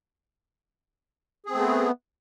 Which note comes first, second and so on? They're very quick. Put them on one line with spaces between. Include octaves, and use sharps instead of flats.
G#4 C4 A3 B3